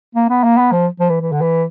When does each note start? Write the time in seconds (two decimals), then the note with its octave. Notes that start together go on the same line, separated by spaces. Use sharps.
0.15 A#3
0.30 B3
0.44 A#3
0.58 B3
0.72 F3
1.00 F3
1.10 E3
1.21 E3
1.32 D3
1.42 E3